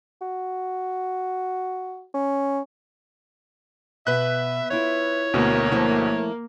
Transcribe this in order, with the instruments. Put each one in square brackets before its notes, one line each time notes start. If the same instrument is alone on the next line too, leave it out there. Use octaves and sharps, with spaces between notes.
[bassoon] F#4
C#4
[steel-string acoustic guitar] B2 [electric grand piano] B4 F#6 [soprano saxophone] E5
[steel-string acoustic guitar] E4 F4 E5 [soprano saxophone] C#5
[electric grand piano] D2 B2 [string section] A#3
[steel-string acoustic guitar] F3 A3 E4